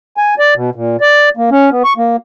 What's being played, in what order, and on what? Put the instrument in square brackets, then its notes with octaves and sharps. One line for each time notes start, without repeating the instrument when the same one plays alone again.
[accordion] G#5
D5
B2
A#2
D5
A#3
C#4
B3
C#6
A#3